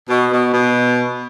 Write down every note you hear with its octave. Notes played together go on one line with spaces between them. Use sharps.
B2
B2
B2